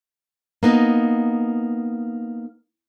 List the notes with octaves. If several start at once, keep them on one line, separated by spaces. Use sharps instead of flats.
A#3 B3 D#4